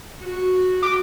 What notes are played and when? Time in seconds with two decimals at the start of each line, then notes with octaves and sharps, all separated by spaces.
0.24 F#4
0.83 D6